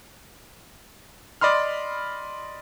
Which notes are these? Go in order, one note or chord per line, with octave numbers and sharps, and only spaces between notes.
D5 D#5 B5 C6 F6